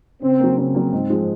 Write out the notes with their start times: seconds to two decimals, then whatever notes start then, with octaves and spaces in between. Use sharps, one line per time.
0.22 C#3 C4
0.40 F#3 A#3
0.57 C#3 C4
0.75 F#3 A#3
0.92 G#2
1.10 F3 G#3